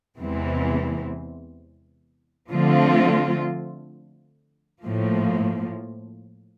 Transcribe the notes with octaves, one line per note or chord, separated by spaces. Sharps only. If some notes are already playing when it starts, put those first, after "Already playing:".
E2 C3 E3 G#3 C4
D3 F3 A3 C4 F4
A2 F3 A#3